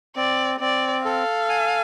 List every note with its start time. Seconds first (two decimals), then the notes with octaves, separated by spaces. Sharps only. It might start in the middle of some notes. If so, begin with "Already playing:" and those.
0.16 C4 D5
0.60 C4 D5
1.05 A4 F5
1.49 G#5